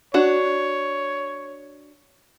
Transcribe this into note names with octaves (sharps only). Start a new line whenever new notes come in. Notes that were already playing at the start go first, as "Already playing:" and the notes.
D4 F#4 C#5